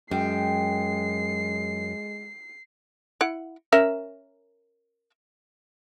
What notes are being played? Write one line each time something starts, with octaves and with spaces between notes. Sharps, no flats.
F#2 G#3 G5 C7
E4 F#5
C#4 A#4 E5